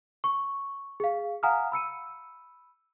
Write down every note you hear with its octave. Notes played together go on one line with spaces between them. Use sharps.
C#6
G#4 F5
F5 F#5 G#5 A#5 D#6 F6
B5 E6 C#7 D#7